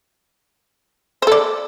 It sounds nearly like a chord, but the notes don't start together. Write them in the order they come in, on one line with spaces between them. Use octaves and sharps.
C5 A4 D5